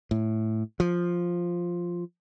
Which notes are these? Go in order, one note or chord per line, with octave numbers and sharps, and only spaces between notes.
A2
F3